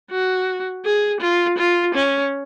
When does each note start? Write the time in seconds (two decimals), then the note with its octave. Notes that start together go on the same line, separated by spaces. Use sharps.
0.11 F#4
0.85 G#4
1.21 F4
1.58 F4
1.95 C#4